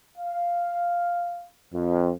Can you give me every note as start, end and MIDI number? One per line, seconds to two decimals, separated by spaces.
0.18 1.47 77
1.73 2.11 41